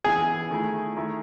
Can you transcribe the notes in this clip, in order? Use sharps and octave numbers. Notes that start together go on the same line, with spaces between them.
E3 B3 E4 G#4
D#3 A3 E4
D#3 A3 E4